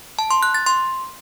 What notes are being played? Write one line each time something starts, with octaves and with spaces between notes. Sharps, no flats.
A5
C6
F#6
A6
C6